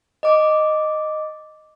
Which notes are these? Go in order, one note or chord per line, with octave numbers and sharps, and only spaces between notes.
D#5 D6